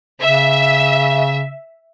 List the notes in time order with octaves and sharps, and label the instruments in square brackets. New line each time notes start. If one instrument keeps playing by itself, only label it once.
[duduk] C#3 [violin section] E5